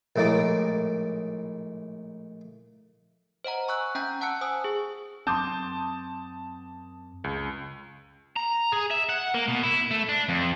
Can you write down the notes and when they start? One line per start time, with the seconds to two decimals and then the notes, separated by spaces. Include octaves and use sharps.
0.16 A#1 A2 G#3 A#3 D5
3.44 C5 D#5 F#5 A#5
3.68 G#5 C#6 E6 F#6
3.95 C#4 E5 G5 A#5 G6
4.21 F#5 A5 E6 F#6 C#7
4.41 C5 G#5 D#6 E6
4.64 G#4
5.27 F#2 F#3 C4 A5 C6 D6 D#6 G6
7.24 C#2
8.36 A#5
8.72 G#4
8.90 E5
9.09 F#5
9.34 A#3
9.48 B2
9.63 E4
9.91 A3
10.09 D4
10.29 F2